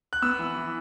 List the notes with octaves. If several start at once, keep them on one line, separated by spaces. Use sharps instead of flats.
F#6
B3 E6
E3
E3